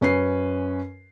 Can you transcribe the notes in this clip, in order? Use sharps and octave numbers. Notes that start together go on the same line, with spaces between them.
F#2 C#4 B4 C7